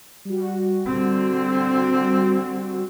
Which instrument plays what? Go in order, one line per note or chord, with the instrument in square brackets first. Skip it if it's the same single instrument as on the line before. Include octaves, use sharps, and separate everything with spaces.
[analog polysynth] G3 F#4
[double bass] D3 C4